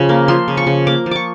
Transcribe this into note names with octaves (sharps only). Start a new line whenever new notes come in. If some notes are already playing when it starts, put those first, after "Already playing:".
Already playing: C#3 F3
A#3
F3 C6
C#3
C#6
C#3
A#3 D6
F3
C#6 D6